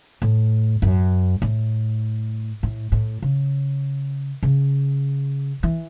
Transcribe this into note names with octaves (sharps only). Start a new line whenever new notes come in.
A2
F#2
A2
A2
A2
C#3
C#3
E3